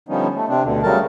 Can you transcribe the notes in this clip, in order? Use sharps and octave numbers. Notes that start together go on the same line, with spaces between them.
D3 F3 G3 B3 C#4 D#4
A3
C3 C4 D4
D2 B2 D3
C#3 F#3 G3 A3 A#4 A5